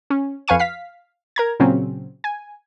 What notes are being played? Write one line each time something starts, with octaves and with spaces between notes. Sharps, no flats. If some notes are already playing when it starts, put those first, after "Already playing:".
C#4
F2 B4 F5 G#5 C#6 D#7
F5 B6
A#4 A#5 G#6
A#2 C#3 F#3 C4 C#4
G#5